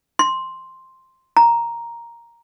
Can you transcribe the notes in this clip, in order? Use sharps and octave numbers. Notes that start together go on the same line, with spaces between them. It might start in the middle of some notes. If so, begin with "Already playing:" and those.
C6
A#5